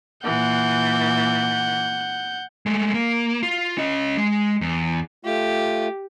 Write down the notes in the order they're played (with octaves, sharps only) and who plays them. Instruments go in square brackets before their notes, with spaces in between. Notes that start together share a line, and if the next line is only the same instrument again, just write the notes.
[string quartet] A#2 E3 [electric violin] F#5 G6
[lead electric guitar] G#3 A3
A#3
F4
C#4 D#5
G#3
E2
[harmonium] A3 F4 [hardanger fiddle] G4